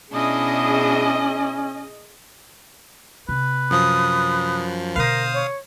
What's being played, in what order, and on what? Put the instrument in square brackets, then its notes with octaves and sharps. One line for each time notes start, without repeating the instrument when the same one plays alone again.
[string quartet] B2 D4 E4 [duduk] C#4 [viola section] G#4 D#5
[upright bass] C3 [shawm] B4
[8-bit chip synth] F#2 F3 [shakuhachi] D#6
[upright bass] B2 D3 [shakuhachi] A#4 [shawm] C5 [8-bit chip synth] F5 D#6
[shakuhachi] C#5